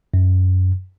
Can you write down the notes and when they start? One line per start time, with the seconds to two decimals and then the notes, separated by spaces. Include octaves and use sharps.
0.14 F#2